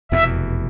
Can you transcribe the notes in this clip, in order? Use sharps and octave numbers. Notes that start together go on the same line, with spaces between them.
F1 E2 B2 E5